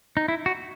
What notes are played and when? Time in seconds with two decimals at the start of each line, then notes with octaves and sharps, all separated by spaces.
0.17 D#4
0.28 E4
0.46 F#4